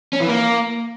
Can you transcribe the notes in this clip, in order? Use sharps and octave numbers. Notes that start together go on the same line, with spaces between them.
C#4
E3
A#3